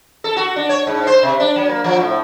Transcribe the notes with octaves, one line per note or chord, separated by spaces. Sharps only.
A4
F#4
D4
C#5
G#2
C5
C3
D4
F#3
A#3
F3
A2